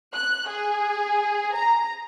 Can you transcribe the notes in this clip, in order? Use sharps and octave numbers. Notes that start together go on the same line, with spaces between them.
F#6
G#4
A#5